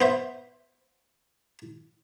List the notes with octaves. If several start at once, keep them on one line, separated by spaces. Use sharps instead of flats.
B3 C5 E5